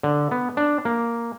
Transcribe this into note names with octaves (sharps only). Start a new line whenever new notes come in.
D3
B3
D4
A#3